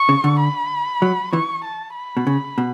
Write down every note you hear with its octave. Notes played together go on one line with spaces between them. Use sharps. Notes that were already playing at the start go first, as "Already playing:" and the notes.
Already playing: C#6
C#3
D3
B5
F#3
E3 C#6
A5
B5
B2
C#3
B2